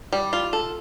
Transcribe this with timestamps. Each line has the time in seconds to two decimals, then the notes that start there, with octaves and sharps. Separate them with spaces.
0.13 G3
0.33 F4
0.53 A4